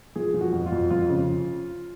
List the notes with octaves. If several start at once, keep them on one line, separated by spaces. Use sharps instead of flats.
F3 G#4
F3
F#4
F2
F4
F2
F2 F4
C#3